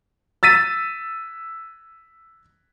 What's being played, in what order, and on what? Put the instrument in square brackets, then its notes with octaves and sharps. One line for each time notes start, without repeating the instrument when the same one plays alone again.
[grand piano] E6 A6 B6 D#7